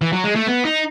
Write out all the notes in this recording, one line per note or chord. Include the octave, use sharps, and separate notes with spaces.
E3
F#3
G#3
A3
B3
D#4